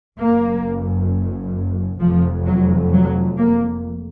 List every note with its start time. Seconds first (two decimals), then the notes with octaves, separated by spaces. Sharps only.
0.19 F#1 F#2 A#3
2.00 F1 F2 F3
2.46 F#3
2.91 F#3
3.37 A#3